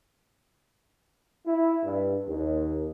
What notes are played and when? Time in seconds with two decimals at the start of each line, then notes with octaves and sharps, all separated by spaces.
1.47 E4
1.84 G2
2.28 D#2